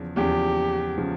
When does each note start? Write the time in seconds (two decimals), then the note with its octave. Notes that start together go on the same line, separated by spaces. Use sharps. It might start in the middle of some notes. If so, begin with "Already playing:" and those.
Already playing: E2 C#3 F3
0.17 E2 C#3 F3 G4
0.98 C#3 F3